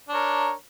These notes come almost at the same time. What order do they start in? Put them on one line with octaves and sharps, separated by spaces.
D4 C#5 A#4